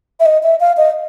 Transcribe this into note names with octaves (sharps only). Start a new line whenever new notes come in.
E5
D#5
E5
F5
D#5